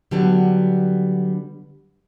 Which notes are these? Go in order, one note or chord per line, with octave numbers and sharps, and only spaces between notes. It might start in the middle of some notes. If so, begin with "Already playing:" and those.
D3 F#3 G3 B3